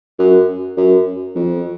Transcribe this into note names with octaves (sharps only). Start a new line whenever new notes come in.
F#2
F#2
F2